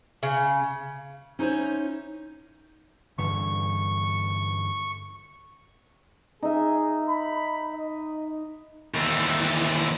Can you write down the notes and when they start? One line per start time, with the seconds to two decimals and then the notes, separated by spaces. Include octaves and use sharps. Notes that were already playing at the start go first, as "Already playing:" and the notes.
0.23 C#3
1.39 C#4 D#4 E4 A4 C5 C#5
3.18 G2 D3 E3 C#6
6.43 D#4 G#4 E5
7.09 B5
7.74 D#5
8.94 D#2 E3